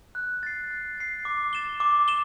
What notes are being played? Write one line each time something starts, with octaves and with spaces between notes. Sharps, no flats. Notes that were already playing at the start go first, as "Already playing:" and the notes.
F#6
A6 C7
F#6
A6 C7
D6
A6 E7 G7
D6
E7 G7